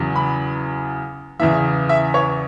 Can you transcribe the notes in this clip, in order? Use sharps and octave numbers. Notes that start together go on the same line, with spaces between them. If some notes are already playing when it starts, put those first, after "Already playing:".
Already playing: E2 C#3 F#3
B5
E2 C#3 E3 E5
E5
C#5